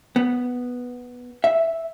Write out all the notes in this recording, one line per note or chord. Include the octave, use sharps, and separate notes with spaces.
B3
E5